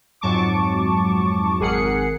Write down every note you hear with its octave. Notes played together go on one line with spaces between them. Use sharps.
F2 G#2 F#3 A5 C#6 D6
G#1 G#4 A#4 F#5 C7 C#7